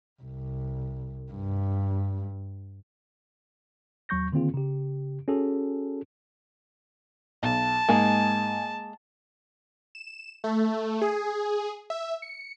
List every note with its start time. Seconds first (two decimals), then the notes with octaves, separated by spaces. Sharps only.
0.22 C2
1.32 G2
4.09 D#2 F#3 C#6 G6 A#6
4.32 D3 D#3 A#3 C4 F4 G#4
4.54 C#3 G4
5.28 C#4 F#4 G#4 A4
7.43 B1 A5
7.89 G#2 G#3 A#3 G#5
9.95 E7
10.44 A3
11.02 G#4
11.90 E5
12.22 C#7